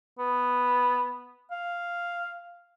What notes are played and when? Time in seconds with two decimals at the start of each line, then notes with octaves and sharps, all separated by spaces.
0.19 B3
1.51 F5